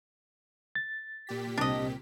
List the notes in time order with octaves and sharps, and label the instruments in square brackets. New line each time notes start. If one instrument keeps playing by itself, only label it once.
[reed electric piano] A6
[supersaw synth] A#2 G4 B6
[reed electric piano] C2 C4 [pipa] D4 D#5